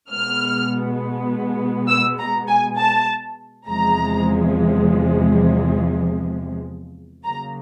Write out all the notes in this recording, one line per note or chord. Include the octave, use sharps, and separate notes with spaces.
B2 G#3 B3 F6
E6
A#5
G#5
A5
E2 C3 F3 G#3 A#5
C#3 F#3 A#3 A#5